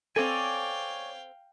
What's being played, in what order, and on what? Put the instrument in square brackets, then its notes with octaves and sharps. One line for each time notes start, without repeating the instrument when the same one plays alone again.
[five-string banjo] C4 A4 [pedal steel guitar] C#5 D5 G#5 [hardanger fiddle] F5 G5